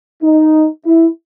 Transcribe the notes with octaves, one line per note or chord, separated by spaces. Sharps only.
D#4
E4